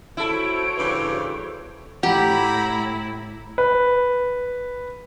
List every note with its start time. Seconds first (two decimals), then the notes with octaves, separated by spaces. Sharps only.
0.17 E4 F#4 A4 C5 C#5 D7
0.77 G2 C#3 E3
2.03 A2 E4 G4 F#5 A#5 B5
3.58 B4